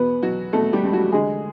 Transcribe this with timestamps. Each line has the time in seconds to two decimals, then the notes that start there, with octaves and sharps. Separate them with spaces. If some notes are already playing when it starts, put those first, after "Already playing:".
Already playing: E2 B2 B3 B4
0.22 B2 F#3 F#4
0.53 B2 A3 A4
0.73 G3 G4
0.83 C#2
0.93 F#3 F#4
1.12 D3 G#3 G#4